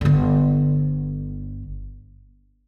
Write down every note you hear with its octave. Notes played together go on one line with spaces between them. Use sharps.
G1 D3